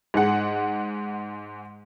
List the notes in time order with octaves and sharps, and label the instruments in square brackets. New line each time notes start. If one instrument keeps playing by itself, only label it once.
[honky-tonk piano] G#2 G#3 F#5